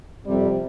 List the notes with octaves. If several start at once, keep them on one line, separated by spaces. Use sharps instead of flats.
F2 C3 G3